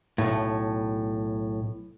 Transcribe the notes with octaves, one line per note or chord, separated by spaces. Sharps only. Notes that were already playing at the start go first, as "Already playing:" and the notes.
B1 A2